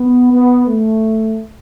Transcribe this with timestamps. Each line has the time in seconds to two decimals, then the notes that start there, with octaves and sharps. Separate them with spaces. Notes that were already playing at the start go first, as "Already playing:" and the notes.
Already playing: B3
0.32 B3
0.67 A3